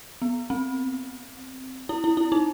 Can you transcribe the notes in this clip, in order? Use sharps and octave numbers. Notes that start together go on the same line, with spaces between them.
B3
C4
E4
E4
E4
D#4